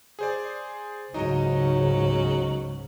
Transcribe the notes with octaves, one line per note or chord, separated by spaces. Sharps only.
G#4 C5 D5
C#2 G#2 C#3 F#3 D#4 D#5